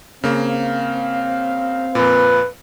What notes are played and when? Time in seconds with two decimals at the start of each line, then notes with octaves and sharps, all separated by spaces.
0.24 C#3 A#3 C4 F5
1.95 F2 A#2 B4